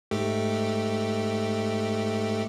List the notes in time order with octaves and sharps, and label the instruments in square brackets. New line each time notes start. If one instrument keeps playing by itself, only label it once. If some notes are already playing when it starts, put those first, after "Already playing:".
[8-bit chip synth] G#2 A3 G4